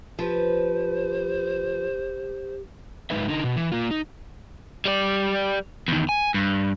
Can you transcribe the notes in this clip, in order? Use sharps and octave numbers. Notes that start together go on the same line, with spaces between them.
F3 G4 B4 C5
G#2 G#3 D#4 B4 E5
D3 D#4
B2
E3
A#3 F4
D#4
G3 D5
E2 D#3
G#5
G2